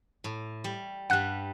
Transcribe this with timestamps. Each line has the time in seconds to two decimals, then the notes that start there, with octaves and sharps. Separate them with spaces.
0.24 A2
0.64 G3
1.10 G2 G3 F#5 F#6